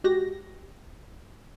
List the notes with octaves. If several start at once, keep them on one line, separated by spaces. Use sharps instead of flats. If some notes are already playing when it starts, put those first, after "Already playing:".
G#3 F#4 G4 A#6